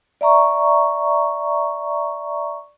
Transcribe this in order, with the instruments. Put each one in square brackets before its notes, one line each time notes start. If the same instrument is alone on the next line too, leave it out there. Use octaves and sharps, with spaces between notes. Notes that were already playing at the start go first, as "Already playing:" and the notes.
[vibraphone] D5 E5 A#5 C#6